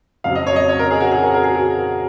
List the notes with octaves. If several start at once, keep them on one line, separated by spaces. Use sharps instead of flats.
F2 C#3 F#3 F5
D#5
C#5
D#5
C#5
A#4
G#4
F#4
G#4
A#4
A#4
G#4
F#4